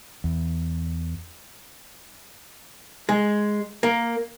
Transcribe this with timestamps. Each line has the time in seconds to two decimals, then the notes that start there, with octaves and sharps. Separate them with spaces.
0.24 E2
3.09 G#3
3.83 A#3